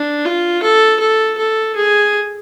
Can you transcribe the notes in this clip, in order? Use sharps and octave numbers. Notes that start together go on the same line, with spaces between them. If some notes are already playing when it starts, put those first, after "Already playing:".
Already playing: D4
F4
A4
A4
A4
G#4